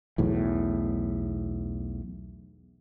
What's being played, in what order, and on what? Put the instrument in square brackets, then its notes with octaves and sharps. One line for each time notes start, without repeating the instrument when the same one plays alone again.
[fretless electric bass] B1 E2 A2